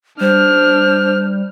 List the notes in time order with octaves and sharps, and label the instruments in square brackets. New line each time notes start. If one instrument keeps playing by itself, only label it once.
[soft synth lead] G3 [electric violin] D4 F6 [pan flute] C5